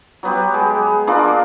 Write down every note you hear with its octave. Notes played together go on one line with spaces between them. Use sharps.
F#3 B3 G4
G#3
G#3 A#3 D4 F4